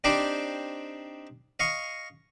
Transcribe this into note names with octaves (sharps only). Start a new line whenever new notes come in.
C4 D4 D#4 G4 C5 D5
D#5 F5 C#6